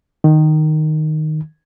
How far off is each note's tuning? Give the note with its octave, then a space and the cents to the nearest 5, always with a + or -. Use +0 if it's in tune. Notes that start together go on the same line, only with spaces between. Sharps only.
D#3 -10